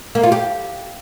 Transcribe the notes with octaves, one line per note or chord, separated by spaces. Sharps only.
A#3
F4
G4